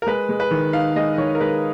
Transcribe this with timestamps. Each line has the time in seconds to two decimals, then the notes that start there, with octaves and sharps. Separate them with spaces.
0.02 A#4
0.07 G#3 B4
0.29 G#3
0.40 B4
0.51 D#3
0.73 D#4 F5
0.96 G#3 D#5
1.18 D#3 C#5
1.35 A#4
1.41 G#3 B4